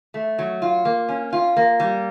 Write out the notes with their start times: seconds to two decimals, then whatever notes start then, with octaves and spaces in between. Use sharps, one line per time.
0.14 A3
0.39 F#3
0.62 F4
0.85 A#3
1.09 C#4
1.33 F4
1.56 A#3
1.80 G3